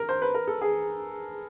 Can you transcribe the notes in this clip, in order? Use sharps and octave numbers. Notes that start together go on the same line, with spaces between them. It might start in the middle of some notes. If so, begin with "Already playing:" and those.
Already playing: A#4
C5
B4
A#4
A4
G#4